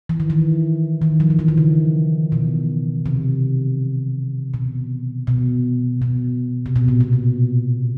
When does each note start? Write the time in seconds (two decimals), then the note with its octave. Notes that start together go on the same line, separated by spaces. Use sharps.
0.09 E3
0.20 D#3
0.30 E3
1.02 D#3
1.20 F3
1.30 F3
1.39 E3
1.48 D#3
1.58 C#3
2.32 B2
3.06 C3
4.54 B2
5.27 B2
6.02 B2
6.66 C3
6.76 B2
6.88 A#2
7.01 B2
7.13 C3